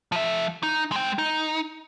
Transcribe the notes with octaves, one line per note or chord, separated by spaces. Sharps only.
F3 E5
D#4
G#3 G5
D#4